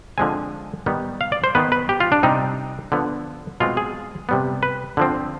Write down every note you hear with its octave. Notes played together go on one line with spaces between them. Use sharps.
D3 F3 G#3 C4 G#5
D#3 G3 B3
F5
D5
C5
D#3 B3 B4
B4
G4
F4
D4
C3 G3 C4 D#4
D3 F3 B3
B2 G#3 C4 F4
G#4
C3 G3 B3
B4
D3 F3 C4